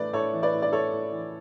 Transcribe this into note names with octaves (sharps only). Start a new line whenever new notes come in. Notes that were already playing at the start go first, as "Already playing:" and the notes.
Already playing: A2 E3 A3 B4 D5
A2 A4 C#5
E3
B4 D5
A2
D5
A3 A4 C#5
A2
E3